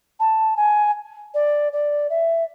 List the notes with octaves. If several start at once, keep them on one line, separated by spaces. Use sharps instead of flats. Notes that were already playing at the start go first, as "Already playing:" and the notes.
A5
G#5
D5
D5
E5